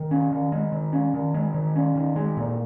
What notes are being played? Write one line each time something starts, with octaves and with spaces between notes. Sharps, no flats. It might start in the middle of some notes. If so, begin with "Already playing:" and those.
Already playing: D#3
C#4
D#3
G#3
D#3
C#4
D#3
G#3
D#3
C#4
D#3
G#3
A#2